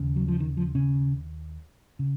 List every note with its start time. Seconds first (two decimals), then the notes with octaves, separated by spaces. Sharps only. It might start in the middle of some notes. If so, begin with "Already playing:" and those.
Already playing: D#2 C#3
0.16 F#3
0.28 F3
0.40 D#3
0.57 F3
0.75 C#3 C#4
1.99 C#3